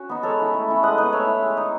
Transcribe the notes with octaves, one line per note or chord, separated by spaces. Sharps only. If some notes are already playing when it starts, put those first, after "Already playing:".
Already playing: C#4 F#4
B3 D#4
G#3 A4 C#5
C#4 E4
A3
C#4 E4
G#3 D#5 F#5
B3 D#4 B4 D#5
A3 C#5 E5
E4
G#3
D#4